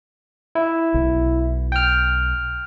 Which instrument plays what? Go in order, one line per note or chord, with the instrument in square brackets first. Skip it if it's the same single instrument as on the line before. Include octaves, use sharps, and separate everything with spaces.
[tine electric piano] E4
[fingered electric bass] B1
[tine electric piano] G5 F6